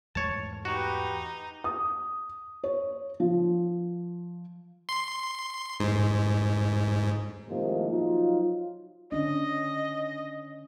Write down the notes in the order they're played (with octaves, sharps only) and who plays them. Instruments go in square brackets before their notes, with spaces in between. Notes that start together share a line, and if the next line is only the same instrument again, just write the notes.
[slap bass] E2 G#2 A3 [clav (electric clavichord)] C#5 A5
[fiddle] D#4 [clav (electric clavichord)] F#4 [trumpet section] G4 B4
[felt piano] D#6
C#5
F3
[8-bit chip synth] C6
G#2
[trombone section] A2 C3 D#3 F3 G#3 A#3
F3 F#3 D#4 F4
[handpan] D3 C#4 D4 [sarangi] D#5